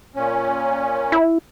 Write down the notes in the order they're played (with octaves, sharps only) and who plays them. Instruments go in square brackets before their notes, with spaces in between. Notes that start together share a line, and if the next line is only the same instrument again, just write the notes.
[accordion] A#2 C#4
[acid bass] E4